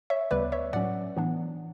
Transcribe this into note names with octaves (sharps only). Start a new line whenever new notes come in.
C#5 E5
D2 C#3 G3 B3 B4 D5
C#5 E5
A2 F#3 C#4 D5 F#5
A2 E3 B3 D4